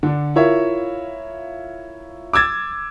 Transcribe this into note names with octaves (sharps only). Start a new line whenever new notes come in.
D3 D4
E4 F4 A#4 C#5 E5
D6 E6 G#6 A6